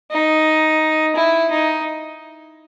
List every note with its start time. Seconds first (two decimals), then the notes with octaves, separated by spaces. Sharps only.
0.11 D#4
1.16 E4
1.51 D#4